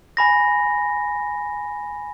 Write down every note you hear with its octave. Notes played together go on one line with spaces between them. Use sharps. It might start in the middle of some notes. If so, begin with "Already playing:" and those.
G#5 B5 A#6